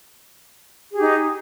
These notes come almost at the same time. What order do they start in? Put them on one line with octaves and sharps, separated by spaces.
G#4 G4 D#4